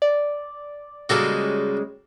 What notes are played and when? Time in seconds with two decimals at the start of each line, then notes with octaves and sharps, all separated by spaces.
0.02 D5
1.09 C#3 G3 G#3 A#3 F#4 A4